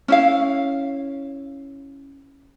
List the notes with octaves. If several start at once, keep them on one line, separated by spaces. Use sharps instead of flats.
C#4 E4 F5